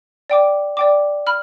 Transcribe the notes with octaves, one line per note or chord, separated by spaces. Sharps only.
D5 G5 D6
D5 G5 D6
B5 F6